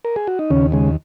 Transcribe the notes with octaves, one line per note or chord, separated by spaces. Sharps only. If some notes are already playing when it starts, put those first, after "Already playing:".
A#4
G#4
F#4
D#4
D#2 C#3 C#4
C#3 G#3